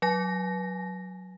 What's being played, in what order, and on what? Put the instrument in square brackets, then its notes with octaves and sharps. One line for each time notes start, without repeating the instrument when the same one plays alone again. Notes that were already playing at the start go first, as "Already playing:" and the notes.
[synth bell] F#3 G#5 A#6